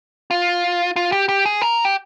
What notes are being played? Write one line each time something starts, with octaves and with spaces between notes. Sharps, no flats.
F4
F4
G4
G4
G#4
A#4
G4